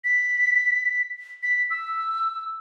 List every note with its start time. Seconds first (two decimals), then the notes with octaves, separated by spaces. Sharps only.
0.04 B6
1.43 B6
1.71 E6